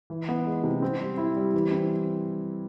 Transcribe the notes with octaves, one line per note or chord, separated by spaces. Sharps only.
E3
B3
G#3
C3
C4
G3
E4
G3
E3
C4